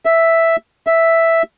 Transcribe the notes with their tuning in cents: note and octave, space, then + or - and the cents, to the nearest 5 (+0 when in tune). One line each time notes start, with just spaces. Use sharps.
E5 +0
E5 +0